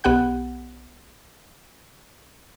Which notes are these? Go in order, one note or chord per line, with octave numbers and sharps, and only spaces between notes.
B1 B3 G4 F#5 F#6